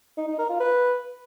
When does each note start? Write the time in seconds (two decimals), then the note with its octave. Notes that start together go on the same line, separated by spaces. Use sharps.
0.18 D#4
0.28 D#4
0.39 A#4
0.49 F4
0.60 B4